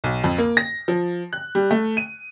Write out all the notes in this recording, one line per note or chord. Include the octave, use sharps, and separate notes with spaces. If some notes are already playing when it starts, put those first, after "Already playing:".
B1
F2
A#3
A#6
F3
F#6
G3
A3
D#7